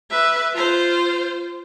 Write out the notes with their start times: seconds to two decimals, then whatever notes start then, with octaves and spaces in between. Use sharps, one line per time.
0.10 B4 E5
0.52 F4 C5